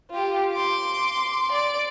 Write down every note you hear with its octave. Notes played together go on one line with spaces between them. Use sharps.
F4 G4
C6 D6
D5